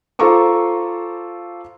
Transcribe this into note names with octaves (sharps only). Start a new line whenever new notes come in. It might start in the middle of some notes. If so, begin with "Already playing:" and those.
F4 A4 C5 A#5 C#6 D6